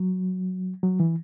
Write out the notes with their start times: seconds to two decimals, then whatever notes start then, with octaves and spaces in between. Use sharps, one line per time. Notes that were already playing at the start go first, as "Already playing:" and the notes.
Already playing: F#3
0.83 F#3
1.00 E3